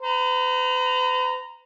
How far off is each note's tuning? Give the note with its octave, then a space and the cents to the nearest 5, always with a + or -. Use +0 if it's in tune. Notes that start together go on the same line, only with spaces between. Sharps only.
B4 +45 A#5 +0